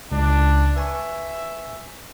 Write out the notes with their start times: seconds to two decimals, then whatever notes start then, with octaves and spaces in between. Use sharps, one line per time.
0.12 C#2 D4
0.76 B4 E5 G#5 C#6